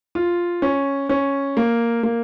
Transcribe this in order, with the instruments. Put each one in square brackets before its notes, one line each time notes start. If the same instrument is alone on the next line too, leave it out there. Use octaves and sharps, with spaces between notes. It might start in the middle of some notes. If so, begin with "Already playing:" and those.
[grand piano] F4
C#4
C#4
A#3
A#3